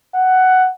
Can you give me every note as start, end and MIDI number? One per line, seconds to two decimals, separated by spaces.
0.15 0.68 78